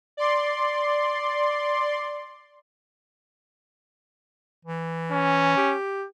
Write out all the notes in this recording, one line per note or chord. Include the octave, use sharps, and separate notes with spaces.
D5 C6
E3
C#4
G4